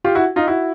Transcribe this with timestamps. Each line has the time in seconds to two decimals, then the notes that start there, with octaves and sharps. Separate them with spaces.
0.04 F4 G4
0.15 E4 F#4
0.36 D#4 F4
0.47 E4 F#4